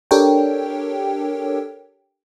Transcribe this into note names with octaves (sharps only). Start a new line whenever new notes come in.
D4 G4 A4 A#4 C#5 G5